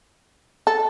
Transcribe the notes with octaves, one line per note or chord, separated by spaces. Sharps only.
A4